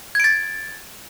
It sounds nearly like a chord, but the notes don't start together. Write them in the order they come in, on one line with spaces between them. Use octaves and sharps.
G#6 D7 A6